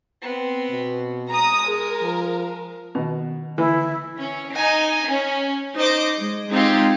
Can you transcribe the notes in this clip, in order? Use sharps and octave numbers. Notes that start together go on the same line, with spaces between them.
B3 C4
B2
G#3 A#5 D#6
G#4 A#4
F3
B2 D#3
D3 E3 E4
C#4
D#4 G#5
C#4
D#4 C5 D#5 D6
G#3
G#3 C4 D#4 F4 G4